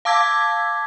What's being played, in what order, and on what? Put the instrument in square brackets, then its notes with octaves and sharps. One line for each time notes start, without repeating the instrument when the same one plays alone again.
[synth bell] F5 A5 D6 E6 G#6 B6